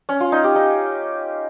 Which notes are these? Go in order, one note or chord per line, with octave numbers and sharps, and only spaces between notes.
C#4
F4
D#4
G4
D#4